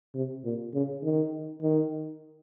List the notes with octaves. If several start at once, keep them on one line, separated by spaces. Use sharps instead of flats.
C3
A#2
C#3
D#3
D#3